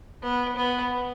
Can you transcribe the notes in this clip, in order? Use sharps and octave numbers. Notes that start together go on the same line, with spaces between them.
B3
B3